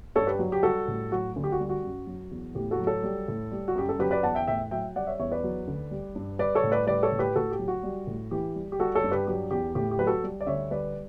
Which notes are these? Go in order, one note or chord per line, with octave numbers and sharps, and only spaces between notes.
G2 A4 C#5
G4 B4
F#3
G4
G3 F#4 A4
A2
F#3 F#4
D2
G4
F#4
G3
F#4
F#2
F#3
E2
A2 G4
F#4 A4
F#3
A4 C#5
G3
A2
G3
F#4
F#2 G4
A4
F#3 G4 B4
B4 D5
E2 F#5 A5
E5 G5
A2 E5 G5
F#3 E5 G5
G3 D5 F#5
C#5 E5
E2 C#5 E5
B4 D5
F#3
D2
G3
G2
G3 B4 D5
A4 C#5
A2
B4 D5
G3 B4 D5
A4 C#5
A2
G4 B4
A2 F#4 A4
G4
F#3
F#4
G3
A2
E3 G4
G3
G4
G3 F#4 A4
A4 C#5
G2
G4 B4
F#3 G4
E2 G4
A2 G4
G4
F#3 B4
F#4 A4
G3
D5
D2 C#5 E5
G3 B4 D5